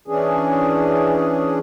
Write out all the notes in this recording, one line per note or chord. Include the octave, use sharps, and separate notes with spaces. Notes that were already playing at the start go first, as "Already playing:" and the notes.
E3 C#4 D4 G#4